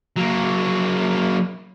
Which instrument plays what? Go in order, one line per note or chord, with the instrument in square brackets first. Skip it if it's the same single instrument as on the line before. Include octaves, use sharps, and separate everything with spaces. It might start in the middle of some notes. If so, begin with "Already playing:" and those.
[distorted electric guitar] F#3 A#3